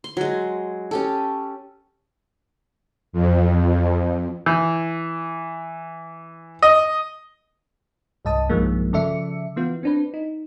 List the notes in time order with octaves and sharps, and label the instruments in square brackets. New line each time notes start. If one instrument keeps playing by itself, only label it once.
[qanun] C6
F#3 G#3
C#4 G4 A4
[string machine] F2
[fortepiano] E3
D#5
[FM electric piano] C2 G2 D#5 A5 D#6
B1 G2 D#3 F3 G#3 A#3
C#3 F3 A4 D5 E5 C#7
E3 B3 F4
C4 D4 B4
D#4